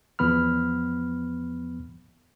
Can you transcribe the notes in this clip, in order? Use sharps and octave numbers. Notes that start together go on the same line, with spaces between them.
E2 F3 B3 B5 F6